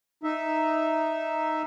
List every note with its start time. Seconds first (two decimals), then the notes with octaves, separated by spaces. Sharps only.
0.24 D#4 E5